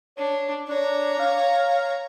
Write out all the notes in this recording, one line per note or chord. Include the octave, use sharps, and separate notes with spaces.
D4 C#5
D4 C#5 A#5
F5